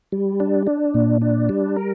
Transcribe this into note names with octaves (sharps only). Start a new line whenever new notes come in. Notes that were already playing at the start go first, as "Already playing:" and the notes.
G3
D4
D4
A#2
D4
G3
A#4